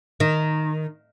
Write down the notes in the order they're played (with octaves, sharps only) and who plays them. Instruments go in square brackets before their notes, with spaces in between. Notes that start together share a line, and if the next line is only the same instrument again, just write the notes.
[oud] D#3